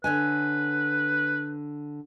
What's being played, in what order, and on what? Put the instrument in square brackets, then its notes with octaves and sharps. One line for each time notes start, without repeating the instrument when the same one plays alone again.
[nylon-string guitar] D3 C#5 G#5 [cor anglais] B4